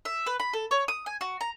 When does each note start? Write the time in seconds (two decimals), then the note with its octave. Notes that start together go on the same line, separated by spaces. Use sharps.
0.05 E5
0.26 B4
0.40 B5
0.53 A4
0.71 C#5
0.88 D#6
1.06 G#5
1.21 F#4
1.41 A#5